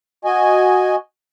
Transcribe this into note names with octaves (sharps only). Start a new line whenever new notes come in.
F#4 D#5 G#5